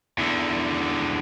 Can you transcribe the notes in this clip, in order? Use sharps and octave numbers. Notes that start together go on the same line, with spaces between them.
E2 D3